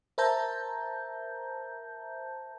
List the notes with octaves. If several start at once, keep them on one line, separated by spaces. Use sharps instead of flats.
A#4 C5 E5 A5 A#5 G6